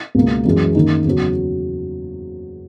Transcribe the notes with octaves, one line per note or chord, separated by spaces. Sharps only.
C#2 B2 A#3
F#2 E3 G#3
F#2 D#3 A#3 D#4
E2 C#3 F#3